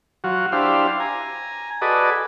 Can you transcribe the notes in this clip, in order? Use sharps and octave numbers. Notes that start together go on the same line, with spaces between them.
F#3 F4 F#4
D4 E4 G4 C5 F5
G#5 A#5
F#4 G#4 A4 B4 D5 D#5